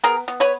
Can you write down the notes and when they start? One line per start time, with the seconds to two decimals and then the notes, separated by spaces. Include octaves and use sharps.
0.04 B3 G#4 A#4
0.28 B3
0.40 B4 C#5